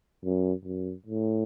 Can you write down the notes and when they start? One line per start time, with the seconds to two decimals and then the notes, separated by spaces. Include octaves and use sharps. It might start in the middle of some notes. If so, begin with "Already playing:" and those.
0.24 F#2
0.65 F#2
1.06 A2